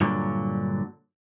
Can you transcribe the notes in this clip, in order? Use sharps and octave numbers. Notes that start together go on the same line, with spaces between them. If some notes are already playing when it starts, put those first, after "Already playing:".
G2 A#2 D3 F#3